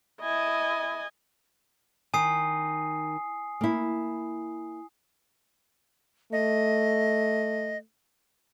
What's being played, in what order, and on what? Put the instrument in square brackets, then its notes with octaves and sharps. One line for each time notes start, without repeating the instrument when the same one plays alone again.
[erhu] E4 [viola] D#5 G#5
[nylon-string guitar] D#3 [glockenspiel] G#5 D#6 C7
[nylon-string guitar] A#3 E4
[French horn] A3 [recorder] D#5